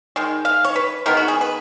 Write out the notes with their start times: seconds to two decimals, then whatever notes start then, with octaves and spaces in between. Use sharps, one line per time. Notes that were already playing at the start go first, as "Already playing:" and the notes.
0.16 D#3 G#3
0.45 F5
0.65 C#5
0.76 B4
1.06 D#3 G#3 B3 A#4
1.17 F#4
1.28 G#4
1.41 B4